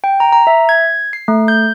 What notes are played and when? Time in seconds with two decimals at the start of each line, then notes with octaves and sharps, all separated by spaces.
0.04 G5
0.20 A#5
0.32 A#5
0.47 E5
0.69 G#6
1.13 C7
1.28 A3
1.48 G6